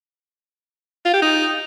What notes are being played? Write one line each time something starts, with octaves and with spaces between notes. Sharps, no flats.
F4
G4
D#4